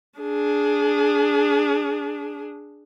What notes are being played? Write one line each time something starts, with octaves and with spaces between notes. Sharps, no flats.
D4 G#4